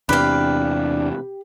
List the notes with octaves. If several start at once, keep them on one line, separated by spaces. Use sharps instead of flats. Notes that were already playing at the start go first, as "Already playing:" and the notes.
E2 C3 D4 G4 B4 F5 G5